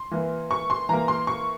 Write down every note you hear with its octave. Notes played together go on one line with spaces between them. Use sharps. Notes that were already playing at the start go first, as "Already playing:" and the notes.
Already playing: C6
E3 A#3
C#6
C6
E3 A#3 A#5
C6
C#6